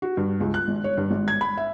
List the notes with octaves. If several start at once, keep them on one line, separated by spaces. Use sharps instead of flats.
F#4
G2
C#2
F#6
G#1
C#5
G2
G#1
G#6
B5
E5